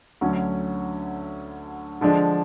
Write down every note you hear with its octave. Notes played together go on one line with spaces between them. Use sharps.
D2 D3 F#3 C#4
D3 F3 G#3 D4